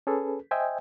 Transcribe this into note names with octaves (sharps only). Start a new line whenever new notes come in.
C#4 G#4 A4 B4
C5 D#5 E5 G5 G#5